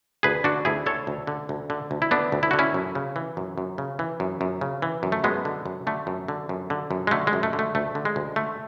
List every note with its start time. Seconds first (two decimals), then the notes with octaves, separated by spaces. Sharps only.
0.23 D2 G#4 B4
0.44 D3 D4 F#4
0.65 D2 E4 G#4
0.86 D3 A4 C#5
1.07 D2
1.27 D3
1.49 D2
1.70 D3
1.91 D2
2.02 E4
2.11 D3 B3 D4
2.32 D2
2.43 E4
2.51 D3 F#4
2.59 C#4 E4
2.74 F#2
2.95 C#3
3.16 E3
3.37 F#2
3.58 F#2
3.78 C#3
3.99 E3
4.20 F#2
4.41 F#2
4.61 C#3
4.82 E3
5.03 F#2
5.12 A3
5.24 F#2 G#3 B3
5.45 D3
5.66 F#2
5.87 D3 A3
6.07 F#2
6.28 D3
6.49 F#2
6.70 D3
6.91 F#2
7.07 G#3
7.11 D3 A3
7.27 G#3
7.33 F#2
7.43 A3
7.53 D3
7.59 A3
7.75 D2 A3
7.95 D3
8.05 G#3
8.16 D2
8.36 D3 A3